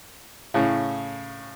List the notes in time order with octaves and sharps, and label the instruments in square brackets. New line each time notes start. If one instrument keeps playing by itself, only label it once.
[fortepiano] A2 C#3